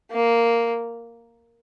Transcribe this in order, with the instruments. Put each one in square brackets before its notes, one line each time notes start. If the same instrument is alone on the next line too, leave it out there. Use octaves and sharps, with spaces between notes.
[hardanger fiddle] A#3